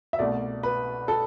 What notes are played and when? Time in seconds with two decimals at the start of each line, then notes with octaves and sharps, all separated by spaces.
0.13 E5
0.19 C2 B2 A3 D5
0.63 B4
1.08 A4